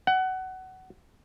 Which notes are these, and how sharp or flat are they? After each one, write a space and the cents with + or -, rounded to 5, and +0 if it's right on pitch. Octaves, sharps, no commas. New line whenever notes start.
F#5 +20